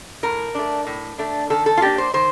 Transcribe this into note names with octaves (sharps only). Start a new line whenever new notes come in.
A2 A#4
A3 D4
A2
A3 D4
D#3 A4
A4
F4
A#3 D4 G4
C5
D#3 C5